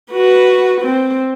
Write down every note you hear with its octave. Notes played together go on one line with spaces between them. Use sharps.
F#4 B4
C4